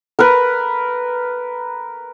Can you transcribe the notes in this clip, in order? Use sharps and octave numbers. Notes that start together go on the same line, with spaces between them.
A#4 B4